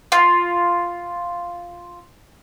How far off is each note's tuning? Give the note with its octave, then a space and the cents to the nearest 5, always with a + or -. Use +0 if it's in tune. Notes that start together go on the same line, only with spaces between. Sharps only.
F4 +0